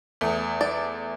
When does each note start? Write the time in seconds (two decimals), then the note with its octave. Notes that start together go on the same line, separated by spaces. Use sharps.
0.21 E2 A3
0.61 D5